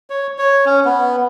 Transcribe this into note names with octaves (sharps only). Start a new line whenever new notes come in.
C#5
C#5
C#4
B3